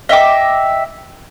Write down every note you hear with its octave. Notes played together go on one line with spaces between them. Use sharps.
D#5 E5 G5 D6